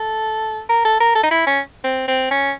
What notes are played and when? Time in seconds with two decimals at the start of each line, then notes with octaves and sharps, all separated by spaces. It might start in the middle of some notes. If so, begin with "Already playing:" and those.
Already playing: A4
0.69 A#4
0.85 A4
1.00 A#4
1.15 A4
1.23 D#4
1.31 E4
1.46 C#4
1.84 C4
2.08 C4
2.31 C#4